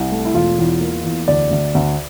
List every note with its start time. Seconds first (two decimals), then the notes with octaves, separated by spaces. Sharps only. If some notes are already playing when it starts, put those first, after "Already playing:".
Already playing: C2
0.11 A3
0.25 E4
0.34 E1 F4
0.58 E2
0.80 A#3
1.04 E2
1.28 D2 D5
1.51 D2
1.75 D2